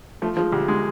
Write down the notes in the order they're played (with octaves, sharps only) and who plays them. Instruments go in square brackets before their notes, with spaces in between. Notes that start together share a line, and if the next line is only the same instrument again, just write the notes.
[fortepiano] F3 [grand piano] A3
[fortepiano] F3 [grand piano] G#3
[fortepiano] D2 [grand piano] G3
[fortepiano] G#3